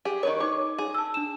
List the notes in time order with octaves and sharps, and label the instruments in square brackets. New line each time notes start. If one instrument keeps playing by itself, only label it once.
[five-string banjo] G4 G#4
[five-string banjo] D#3 B4 C#5 [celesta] A#4 D#5
[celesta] D#4 D6 [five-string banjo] C#5
[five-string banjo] G#4
[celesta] A5 E6
D4 E7